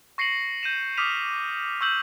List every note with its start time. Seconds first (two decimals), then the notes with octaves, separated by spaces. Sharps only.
0.18 C#6 A#6 C7 C#7 D#7 F#7
0.63 G6 D#7 E7
0.97 D6 D#6 F6 B6 D#7 F7
1.81 C#6 E6 G6 F#7